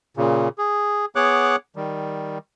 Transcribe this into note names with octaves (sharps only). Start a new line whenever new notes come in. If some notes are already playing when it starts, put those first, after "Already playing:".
A#2 C#3
G#4
B3 G#4 C#5 F#5 D6 F#6
D#3 G3